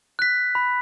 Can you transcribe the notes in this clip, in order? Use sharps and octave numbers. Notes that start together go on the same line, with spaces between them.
F#6 B6
B5